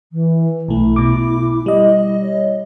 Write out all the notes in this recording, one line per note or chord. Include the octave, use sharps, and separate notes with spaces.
E3
B1 A3 E4
B2 D6
G3 D#5
C#5